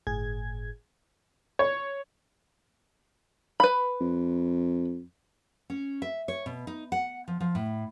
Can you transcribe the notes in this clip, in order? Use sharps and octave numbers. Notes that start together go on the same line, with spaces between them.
G1 A2 G#4 G#6
C#5
B4 B5
F2
C#4
E5
C#5
B2
D#4
F#5
F3
F3
A2